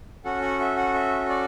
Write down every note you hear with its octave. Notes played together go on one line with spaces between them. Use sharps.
C#4 F#4 A4 F#5
F#5
E5
F#5
E5
D5